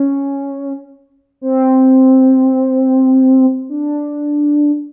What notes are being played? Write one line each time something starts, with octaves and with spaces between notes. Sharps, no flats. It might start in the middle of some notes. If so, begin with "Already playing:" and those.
Already playing: C#4
C4
D4